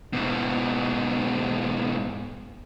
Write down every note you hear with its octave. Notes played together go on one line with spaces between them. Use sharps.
G#2 B2